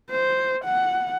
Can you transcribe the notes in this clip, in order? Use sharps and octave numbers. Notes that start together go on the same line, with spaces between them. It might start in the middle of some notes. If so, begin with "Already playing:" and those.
C5
F#5